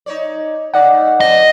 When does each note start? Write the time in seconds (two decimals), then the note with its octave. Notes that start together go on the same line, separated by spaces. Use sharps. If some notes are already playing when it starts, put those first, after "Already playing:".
0.06 D#4 C#5 D5
0.74 C#3 F#3 D#4 D5 F#5
0.92 A3
1.20 F2 C4 G4 D#5